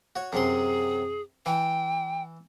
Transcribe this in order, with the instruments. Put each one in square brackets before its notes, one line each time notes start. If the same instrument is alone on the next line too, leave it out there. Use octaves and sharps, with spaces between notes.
[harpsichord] F#4 C#5
[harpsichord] F#2 C3 C6 [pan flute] G#4
[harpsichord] E3 [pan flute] G5